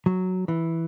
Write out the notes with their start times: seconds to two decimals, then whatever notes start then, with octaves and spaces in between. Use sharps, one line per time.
0.06 F#3
0.48 E3